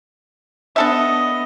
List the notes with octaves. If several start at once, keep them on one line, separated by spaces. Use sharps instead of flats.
B3 D4 A4 D#5 E5